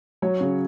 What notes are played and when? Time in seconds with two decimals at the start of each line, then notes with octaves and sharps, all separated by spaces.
0.22 F#3 C#5
0.41 C#3